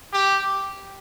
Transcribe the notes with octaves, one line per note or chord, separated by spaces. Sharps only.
G4